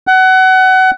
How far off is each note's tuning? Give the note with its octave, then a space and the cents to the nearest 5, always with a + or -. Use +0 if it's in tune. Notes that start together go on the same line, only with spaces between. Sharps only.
F#5 +25